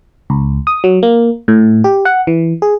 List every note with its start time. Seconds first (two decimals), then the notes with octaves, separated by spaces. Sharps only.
0.30 C#2
0.67 D#6
0.84 F#3
1.03 A#3
1.48 A2
1.84 G4
2.05 F#5
2.27 E3
2.62 G#4